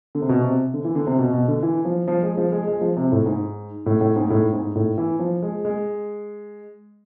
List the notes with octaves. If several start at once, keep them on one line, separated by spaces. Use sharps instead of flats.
D3
C3
B2
C3
D3
E3
D3
C3
B2
B2
D3
E3
F3
F3
G#3
F3
G#3
G#3
F3
C3
A2
G#2
A2
A2
G#2
A2
G#2
A2
E3
F3
G#3
G#3